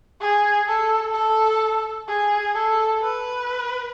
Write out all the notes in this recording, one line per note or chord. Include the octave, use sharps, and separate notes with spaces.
G#4
A4
A4
G#4
A4
B4